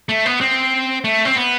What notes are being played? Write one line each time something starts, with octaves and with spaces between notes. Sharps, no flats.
A3
B3
C4
A3
C4
B3